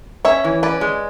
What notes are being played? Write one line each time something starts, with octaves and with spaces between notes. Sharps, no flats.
C#4 C#5 E5
E3
C#4 B4 D5
G#3